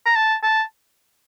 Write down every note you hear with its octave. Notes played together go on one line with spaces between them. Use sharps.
A#5
A5
A5